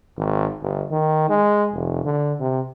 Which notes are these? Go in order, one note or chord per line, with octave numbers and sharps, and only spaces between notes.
G#1
G1
D#3
G#3
F1
D3
C3